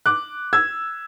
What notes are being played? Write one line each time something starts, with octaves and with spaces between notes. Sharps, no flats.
D6 F#6
E6 G#6